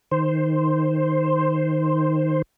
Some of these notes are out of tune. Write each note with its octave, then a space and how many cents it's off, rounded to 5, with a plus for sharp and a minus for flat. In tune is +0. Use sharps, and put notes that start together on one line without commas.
D#3 +0 C5 +0